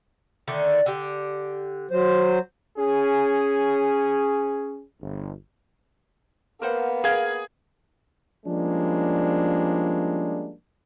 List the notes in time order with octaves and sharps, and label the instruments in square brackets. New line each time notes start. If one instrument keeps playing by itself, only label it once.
[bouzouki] D3 D#3 A3
D3 G4
[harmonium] F#3 C5
[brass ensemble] C#4 G#4
G1
[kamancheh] A#3 B3 [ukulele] A#4 C5 F#5
[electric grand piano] G#4 G#6 [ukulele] A#4 F5
[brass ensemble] F3 G3 G#3 A#3 C#4 D4